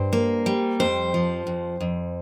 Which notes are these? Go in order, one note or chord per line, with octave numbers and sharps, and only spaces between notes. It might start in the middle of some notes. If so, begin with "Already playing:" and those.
Already playing: G2 C5
A#3
G3
F2 C5
F3
F2
F2